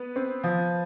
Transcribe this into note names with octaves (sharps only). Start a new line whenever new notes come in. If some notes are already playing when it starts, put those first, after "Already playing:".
Already playing: B3 B4
C4
F3